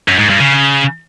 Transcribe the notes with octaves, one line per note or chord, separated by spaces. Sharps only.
F#2
G#2
G2
C#3